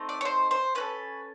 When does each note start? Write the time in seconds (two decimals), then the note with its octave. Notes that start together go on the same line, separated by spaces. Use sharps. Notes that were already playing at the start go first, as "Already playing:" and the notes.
Already playing: A3 C4 D#4
0.09 D5
0.21 C#5
0.25 C5
0.51 C5
0.75 C#4 F#4 A4 B4